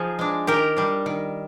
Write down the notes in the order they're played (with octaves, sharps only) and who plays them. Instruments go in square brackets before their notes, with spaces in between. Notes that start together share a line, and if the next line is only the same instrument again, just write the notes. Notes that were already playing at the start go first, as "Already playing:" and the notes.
Already playing: [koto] F3 D#4 F4 G#4
G#3 D4
D#3 G4 A#4
G3 D4
D#3